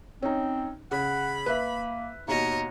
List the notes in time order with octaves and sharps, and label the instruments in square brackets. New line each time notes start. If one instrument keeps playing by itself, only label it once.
[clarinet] C4 [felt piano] C#4 D#4
[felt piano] C#3 [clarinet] F#5 [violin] B5
[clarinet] A#3 [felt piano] B4 E5
[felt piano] D#2 B2 [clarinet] D#4 [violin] C#5 D#5